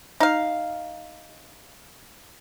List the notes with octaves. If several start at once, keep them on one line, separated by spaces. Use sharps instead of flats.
D#4 F5